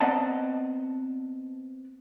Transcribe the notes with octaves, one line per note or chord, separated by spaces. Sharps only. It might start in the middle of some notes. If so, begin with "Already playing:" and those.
B3 C4 D5 D#5 F#5 A5